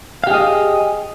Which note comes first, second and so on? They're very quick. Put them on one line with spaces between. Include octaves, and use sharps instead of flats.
F5 G4 G#4 D#5